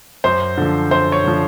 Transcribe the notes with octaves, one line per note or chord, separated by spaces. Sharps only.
F#2 C5
D3 F3
F#2 C5
C#5
D3 F3